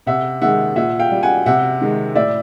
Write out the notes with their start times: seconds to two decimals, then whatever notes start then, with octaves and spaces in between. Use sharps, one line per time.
0.07 C3 E5 F#5
0.42 D#3 G#3 E5 F#5
0.76 A#2 E5 F#5
0.99 F5 G5
1.12 G3
1.23 F#5 G#5
1.46 C3 E5 F#5
1.81 D#3 G#3
2.15 A2 D5 E5